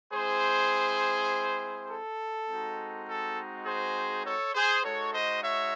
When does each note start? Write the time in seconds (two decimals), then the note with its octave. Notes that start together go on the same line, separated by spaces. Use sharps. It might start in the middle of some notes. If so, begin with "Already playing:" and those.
0.13 G#3 C4 E4 G#4 C5
1.90 A4
2.49 G#3 C4 D#4 F#4
3.07 A4
3.66 G#4 C5
4.25 A4 C#5
4.55 G#4 C5
4.84 G#3 D#4 F#4 A4 C#5
5.14 C5 D#5
5.44 C#5 E5